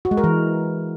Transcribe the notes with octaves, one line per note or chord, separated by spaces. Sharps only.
F#4
G#3
A#4
E3